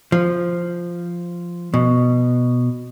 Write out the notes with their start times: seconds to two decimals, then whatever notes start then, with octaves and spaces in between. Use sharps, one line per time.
0.12 F3
1.74 B2